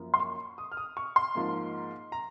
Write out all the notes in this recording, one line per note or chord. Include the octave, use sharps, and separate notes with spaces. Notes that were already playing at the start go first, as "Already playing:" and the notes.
Already playing: F#2 F3 A#3
C6
C#6
D#6
F6
D#6
C#6
C6
G#2 F3 A#3
A#5